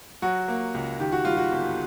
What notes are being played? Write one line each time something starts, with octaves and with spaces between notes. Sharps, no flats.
F#3 F#4
A#3
C#2
D#3 G4
F#4
G3 F4
F#4
G1